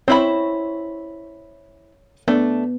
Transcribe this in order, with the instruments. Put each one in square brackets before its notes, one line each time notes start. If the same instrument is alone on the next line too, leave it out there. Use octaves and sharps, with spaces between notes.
[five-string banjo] C4 E4 B5 [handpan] C#5
[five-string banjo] A3 D4 [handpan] B3